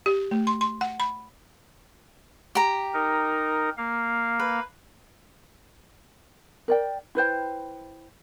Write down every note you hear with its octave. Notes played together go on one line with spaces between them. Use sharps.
G4
A3
C6
C6
F#5
B5
G4 A#5
D#4 A#4
A#3 F5
B4
A#4 D5 G5
E4 B4 C5 G5